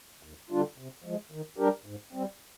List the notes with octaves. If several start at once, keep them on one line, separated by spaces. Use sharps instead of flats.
D#2
D3 G3 D4 F4
C3
F3 G#3
D#3
G3 D4 G4 A#4
G#2
G3 C4